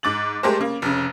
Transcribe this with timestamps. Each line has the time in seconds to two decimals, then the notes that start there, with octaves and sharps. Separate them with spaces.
0.03 G#2 D6 A6 F#7
0.43 G#3 A3 G4 A#4 C5
0.60 C#3 A#3
0.82 F1 C#3